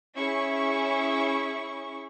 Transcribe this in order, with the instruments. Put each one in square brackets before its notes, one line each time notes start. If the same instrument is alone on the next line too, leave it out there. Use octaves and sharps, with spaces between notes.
[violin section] C#4 E4 G#4 E5 C#6